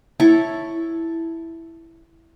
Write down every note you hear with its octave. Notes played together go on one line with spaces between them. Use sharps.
E4 A4 C#5